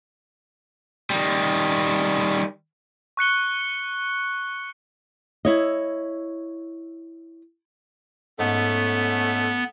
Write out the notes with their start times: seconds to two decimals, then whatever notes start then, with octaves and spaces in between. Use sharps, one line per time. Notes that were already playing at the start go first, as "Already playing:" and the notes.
1.10 D#3 G3
3.17 C#6 F#6 C#7 G7
5.45 E4 C#5 D#5
8.39 G#2 A3 B3 C#4 A4